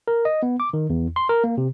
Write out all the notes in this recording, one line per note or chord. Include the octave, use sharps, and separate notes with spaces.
A#4
D#5
B3
D6
D#3
E2
C6
A#4
A#3
C3